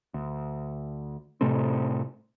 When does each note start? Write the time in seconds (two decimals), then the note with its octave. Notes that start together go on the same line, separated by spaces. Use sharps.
0.14 D2
1.41 A2 C3 A3 C4